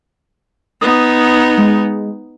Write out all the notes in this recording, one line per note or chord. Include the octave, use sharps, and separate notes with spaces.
B3 D#4 D#6
G#3